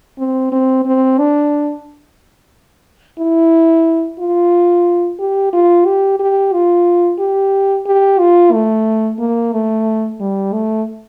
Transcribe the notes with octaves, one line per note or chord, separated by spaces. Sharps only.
C4
C4
C4
D4
E4
F4
G4
F4
G4
G4
F4
G4
G4
F4
A3
A#3
A3
G3
A3